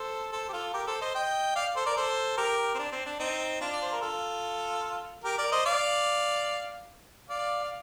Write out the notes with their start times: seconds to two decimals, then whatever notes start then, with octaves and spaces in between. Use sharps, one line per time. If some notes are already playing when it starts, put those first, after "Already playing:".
Already playing: A4 C5
0.32 A4 C5
0.49 G4
0.53 F4 A4
0.74 G4 A#4
0.87 A4 C5
1.01 C5 D#5
1.15 D#5 G5
1.55 D5 F5
1.76 A4 C5
1.86 A#4 D5
1.96 A4 C5
2.37 G4 A#4
2.74 C4
2.79 D4
2.92 C4
3.06 D4
3.19 C4 D#4
3.61 D4 F4
3.72 D5
3.82 C5
3.92 A#4
4.01 F4 A4
5.24 G4 A#4
5.38 A#4 D5
5.52 C5 D#5
5.66 D5 F5
7.29 D5 F5
7.62 F5